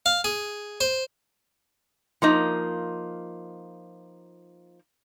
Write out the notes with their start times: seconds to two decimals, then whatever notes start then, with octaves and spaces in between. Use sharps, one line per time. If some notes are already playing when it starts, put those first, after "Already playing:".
0.06 F5
0.24 G#4
0.81 C5
2.22 F3 A#3 D#4